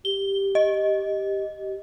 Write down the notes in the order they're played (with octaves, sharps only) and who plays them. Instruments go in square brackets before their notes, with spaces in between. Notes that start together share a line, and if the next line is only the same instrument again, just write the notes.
[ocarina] G4 [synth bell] G7
[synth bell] D#5